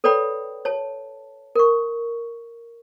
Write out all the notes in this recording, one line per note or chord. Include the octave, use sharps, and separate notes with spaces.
A4 B4 C#5 D5 G5 B5
C#5 A5
A#4 C#6